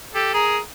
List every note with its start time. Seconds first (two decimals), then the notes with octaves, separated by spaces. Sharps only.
0.14 G4 A4
0.34 G#4 A#4